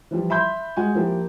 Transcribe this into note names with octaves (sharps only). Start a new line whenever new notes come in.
E3 F3 G3
E5 B5 C6 G6
G#3 F#4 F#5 G#5
F3 A#3 E4 G4